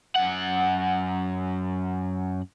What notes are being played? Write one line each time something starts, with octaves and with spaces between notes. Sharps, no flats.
F#2 F#5